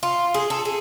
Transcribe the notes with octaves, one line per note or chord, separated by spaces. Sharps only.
F4
G#4
A4
G#4